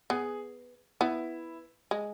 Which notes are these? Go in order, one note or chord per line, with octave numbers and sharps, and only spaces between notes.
B3 G#4
B3 E4
G#3